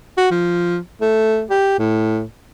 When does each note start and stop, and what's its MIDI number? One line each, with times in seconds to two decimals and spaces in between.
0.18 0.28 66
0.31 0.78 53
1.01 1.43 57
1.50 1.78 67
1.79 2.23 45